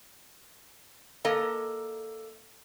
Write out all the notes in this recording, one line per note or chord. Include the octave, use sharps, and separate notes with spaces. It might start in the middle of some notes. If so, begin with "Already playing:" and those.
A#3 A4 D#5 A#5